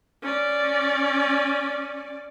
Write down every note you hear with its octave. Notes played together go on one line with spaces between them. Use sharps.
C#4 D5